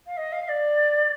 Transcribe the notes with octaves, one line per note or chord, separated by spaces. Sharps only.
F5
D#5
F5
D5